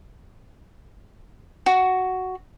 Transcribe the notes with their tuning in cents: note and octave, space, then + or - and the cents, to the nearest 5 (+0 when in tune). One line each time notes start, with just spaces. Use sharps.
F#4 +5